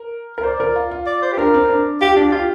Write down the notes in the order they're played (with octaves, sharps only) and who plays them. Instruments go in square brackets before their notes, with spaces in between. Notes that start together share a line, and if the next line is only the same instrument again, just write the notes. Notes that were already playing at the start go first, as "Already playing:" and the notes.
Already playing: [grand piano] A#4
A#4
[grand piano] C5 [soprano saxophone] D5
[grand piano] A#4
F4
F4
[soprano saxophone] D5
C5
G4
[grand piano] D4 [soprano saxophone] A#4
[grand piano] C4
D4
[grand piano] F4 [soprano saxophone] G4
[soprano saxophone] D4 [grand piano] G4
[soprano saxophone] F4 [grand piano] G4